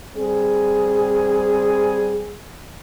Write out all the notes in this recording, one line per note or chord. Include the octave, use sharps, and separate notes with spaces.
G3 C4 G#4